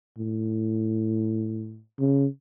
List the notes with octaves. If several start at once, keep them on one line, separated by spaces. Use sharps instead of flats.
A2
C#3